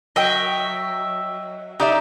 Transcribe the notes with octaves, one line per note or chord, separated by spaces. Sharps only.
F#3 D#5 E5 G5
D#4 G4 D5 E5